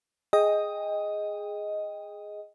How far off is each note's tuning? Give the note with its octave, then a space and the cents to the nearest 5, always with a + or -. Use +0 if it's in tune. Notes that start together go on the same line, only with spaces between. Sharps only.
G#4 +0 D#5 +5 G5 +25